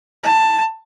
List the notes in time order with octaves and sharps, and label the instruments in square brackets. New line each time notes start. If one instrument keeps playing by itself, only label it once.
[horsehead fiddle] A5